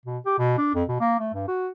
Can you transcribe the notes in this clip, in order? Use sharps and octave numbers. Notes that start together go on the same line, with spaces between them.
B2
G4
B2
D4
F2
B2
A#3
A3
G2
F#4